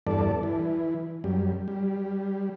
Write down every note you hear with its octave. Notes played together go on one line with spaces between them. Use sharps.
E2 G2 A4 D5
E3
F#2 G3
G3